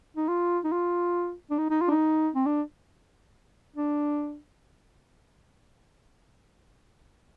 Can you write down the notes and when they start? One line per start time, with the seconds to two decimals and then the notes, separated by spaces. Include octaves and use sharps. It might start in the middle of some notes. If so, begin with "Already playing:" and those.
0.16 D#4
0.28 F4
0.64 D#4
0.72 F4
1.50 D4
1.58 D#4
1.70 D#4
1.81 F4
1.88 D4
1.91 D#4
2.35 C4
2.46 D4
3.76 D4